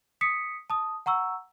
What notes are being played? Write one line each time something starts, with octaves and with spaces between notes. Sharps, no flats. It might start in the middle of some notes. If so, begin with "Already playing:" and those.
D#6 B6 C#7
A5 D#6
F#5 A#5 C#6 E6